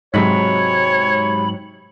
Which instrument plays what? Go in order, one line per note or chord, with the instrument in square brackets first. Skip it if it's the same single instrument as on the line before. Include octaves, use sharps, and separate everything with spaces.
[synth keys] G#2 F#3 [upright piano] C3 G#3 B6 [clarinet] C#5 [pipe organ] B5